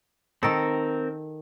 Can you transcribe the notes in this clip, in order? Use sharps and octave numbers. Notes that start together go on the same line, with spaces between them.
D#3 C4 A4 A#4